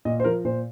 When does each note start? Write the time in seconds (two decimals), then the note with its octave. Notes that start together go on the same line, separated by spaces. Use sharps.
0.05 A#2 D#5
0.20 C5
0.24 F3 A#4
0.45 A#2 C5